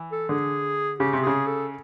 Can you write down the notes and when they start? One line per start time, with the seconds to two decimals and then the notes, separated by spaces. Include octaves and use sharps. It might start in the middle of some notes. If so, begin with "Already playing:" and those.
Already playing: E3
0.12 A4
0.29 D3 G#4
1.00 C#3 G4
1.13 C3 G4
1.23 C#3 G#4
1.47 A4